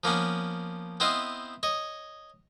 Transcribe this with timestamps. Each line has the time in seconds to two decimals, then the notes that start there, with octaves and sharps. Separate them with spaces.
0.04 F3 A#3 B3 C#4
1.00 B3 C4 E4 C5 D#5 F5
1.63 C#5 D#5